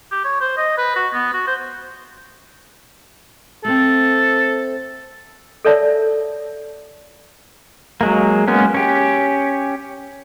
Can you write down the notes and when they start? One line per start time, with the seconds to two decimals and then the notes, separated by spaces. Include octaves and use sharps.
0.12 G4
0.24 C#5
0.41 C5
0.57 D#5
0.78 B4
0.96 F#4
1.13 B3
1.33 F#4
1.47 C5
3.65 A3 C4 A4
5.65 A4 A#4 C#5 D5 E5 A5
8.01 F#3 G#3 A#3
8.48 G#3 A#3 B3 C#4
8.74 C#4 G4